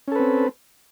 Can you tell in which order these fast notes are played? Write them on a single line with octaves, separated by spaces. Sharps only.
C#4 A4 B4 C4